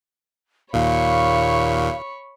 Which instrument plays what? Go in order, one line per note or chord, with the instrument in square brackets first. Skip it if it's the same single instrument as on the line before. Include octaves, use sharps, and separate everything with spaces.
[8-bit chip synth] D#2 A#2 [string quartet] C#5 B5 C#6 [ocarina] F5